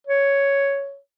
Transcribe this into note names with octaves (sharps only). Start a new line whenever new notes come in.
C#5